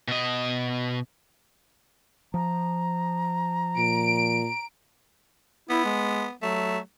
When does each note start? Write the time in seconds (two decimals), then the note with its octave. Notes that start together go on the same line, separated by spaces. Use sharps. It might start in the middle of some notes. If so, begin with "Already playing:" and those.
0.08 B2 D#5
2.34 F3 A#5
3.78 A#2 D7
5.69 B3 E4
5.84 G#3
6.42 F#3 A3